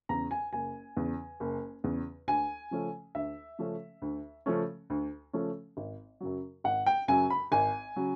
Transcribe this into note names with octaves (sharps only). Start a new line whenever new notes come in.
E2 C#3 A#5
G#5
F#1 G#5
E2 C#3
F#1
E2 C#3
D2 G#5
C#3 F3 A3 C#4
D2 E5
C#3 F3 A3 C#4
D2
C#3 F3 A3 C#4
D2
C#3 F3 A3 C#4
G#1
F#2 C#3 F#3
G#1 F#5
G5
F#2 C#3 F#3 G#5
B5
G#1 G#5
C#3 F#3